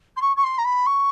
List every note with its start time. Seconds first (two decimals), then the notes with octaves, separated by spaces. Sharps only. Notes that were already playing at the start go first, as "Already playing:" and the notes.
0.16 C6
0.21 C#6
0.37 C#6
0.43 C6
0.58 A#5
0.65 B5
0.86 C#6